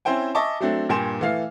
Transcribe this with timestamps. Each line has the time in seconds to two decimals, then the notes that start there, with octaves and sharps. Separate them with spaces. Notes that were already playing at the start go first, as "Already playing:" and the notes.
0.05 C4 C#4 E4 C5 G5 G#5
0.35 D#5 E5 G#5 A5 C#6 D6
0.60 F#3 A3 C4 D4
0.89 G2 A#2 G5 G#5 C6 E7
1.21 E3 A3 F5 F6 C7